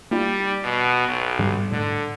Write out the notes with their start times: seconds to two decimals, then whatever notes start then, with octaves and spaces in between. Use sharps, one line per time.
0.11 G3 A#3 D#4 F4
0.64 B2
1.08 B1
1.39 G#2 D3 G3
1.72 A2 D3